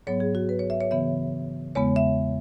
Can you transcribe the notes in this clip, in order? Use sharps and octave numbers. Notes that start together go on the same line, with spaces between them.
G#2 F#3 B3 C#5
G#4
F#4
B4
C#5
E5
C#5
C#3 E3 B3 E5
E2 C#3 G#3 B3 C#5
E5